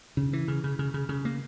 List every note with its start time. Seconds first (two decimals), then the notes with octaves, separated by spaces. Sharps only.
0.17 C#3
0.33 E3
0.48 C#3
0.64 C#3
0.79 C#3
0.94 C#3
1.09 C#3
1.25 A#3